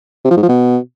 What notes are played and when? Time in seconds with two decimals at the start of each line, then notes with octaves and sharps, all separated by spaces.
0.25 C3
0.31 F3
0.37 G#2
0.43 F3
0.49 B2